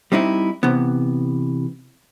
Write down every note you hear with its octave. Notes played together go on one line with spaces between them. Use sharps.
G3 C4 D#4 E4
C3 E3 B3